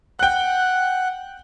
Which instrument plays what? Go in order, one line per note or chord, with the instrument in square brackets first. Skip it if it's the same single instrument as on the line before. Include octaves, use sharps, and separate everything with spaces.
[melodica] F#5 [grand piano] G5 F#6